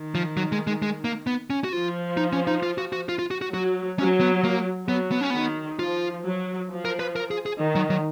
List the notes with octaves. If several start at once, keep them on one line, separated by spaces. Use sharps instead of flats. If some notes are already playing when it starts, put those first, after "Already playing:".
Already playing: D#3
F3
F#3
G#3
G#3
G#3
A#3
B3
C#4
F#4
F3 F4
D#4
C#4
D#4
F4
F#4
F#4
F4
F4
F#4
F#4
F#3 F#4
F#3 C#4
B3
A#3
F#3 B3
B3
C#4
D#3 B3
F3 F4
F#3
F3
A#4
B4
A#4
G#4
G#4
D#3
F#3
F#3